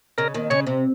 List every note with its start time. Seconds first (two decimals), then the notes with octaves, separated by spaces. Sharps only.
0.18 C#3 A#4
0.34 D#2 D#3
0.50 C#3 C#5
0.67 C3